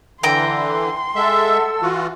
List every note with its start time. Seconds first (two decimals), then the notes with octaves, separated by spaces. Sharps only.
0.23 D3 E3 G5 A#5 C6
1.16 G#3 A4 E5 F#5 E6
1.82 E3 F4 F#4